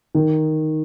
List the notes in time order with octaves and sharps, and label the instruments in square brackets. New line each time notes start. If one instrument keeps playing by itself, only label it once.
[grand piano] D#3